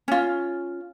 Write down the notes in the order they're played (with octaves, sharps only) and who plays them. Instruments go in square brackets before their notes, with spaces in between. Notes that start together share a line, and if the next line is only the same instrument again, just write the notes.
[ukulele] C#4 F4